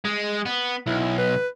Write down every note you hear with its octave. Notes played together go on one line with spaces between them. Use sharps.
G#3
B3
B1 E4
B4